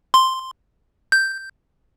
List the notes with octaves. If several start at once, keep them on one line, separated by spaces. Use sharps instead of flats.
C6
G6